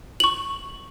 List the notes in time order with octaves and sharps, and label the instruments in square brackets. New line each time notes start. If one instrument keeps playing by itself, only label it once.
[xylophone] C#6 F#7